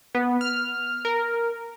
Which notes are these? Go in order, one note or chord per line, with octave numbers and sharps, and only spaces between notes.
B3
F6
A#4